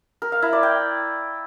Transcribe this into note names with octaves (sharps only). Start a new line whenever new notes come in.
A#4
F5
E4
D5
G5